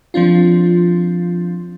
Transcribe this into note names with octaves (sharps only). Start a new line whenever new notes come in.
F3 C4 D4 F4